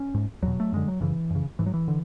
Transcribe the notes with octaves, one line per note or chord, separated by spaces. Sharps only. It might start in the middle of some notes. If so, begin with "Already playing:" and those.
Already playing: C#4
G#2
E2 B2 F#3
A3
F#2 D3 G#3
F#3
F#2 C#3 E3
F#2 C#3
G#2 E3
F#3
E3
D3